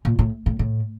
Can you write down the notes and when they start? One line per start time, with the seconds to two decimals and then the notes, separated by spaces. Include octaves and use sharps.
0.05 A#2
0.19 A2
0.46 A2
0.59 A2